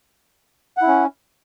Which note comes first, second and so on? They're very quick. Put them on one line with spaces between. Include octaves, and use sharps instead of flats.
F#5 E4 C#4